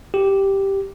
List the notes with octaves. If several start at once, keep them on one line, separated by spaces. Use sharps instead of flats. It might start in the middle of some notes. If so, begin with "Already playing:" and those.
G4